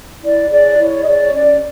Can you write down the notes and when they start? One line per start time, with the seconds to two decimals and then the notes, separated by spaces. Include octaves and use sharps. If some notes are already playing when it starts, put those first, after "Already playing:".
0.23 E4 D5
0.50 G#4 C#5 D5
0.78 E4 C#5
1.01 D#5
1.06 G#4 C#5 D5
1.22 C#5
1.33 C#4 D5